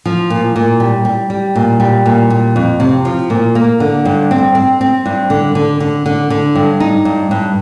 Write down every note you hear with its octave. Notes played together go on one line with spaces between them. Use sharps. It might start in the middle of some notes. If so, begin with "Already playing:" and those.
F3
A#2
A#2
G3
G3
G3
A#2
G3
A#2
G3
F2
C3
F3
A#2
A#3
D3
G2
C4
C4
C4
G2
D3
D3
D3
D3
D3
G2
D#4
G2
G2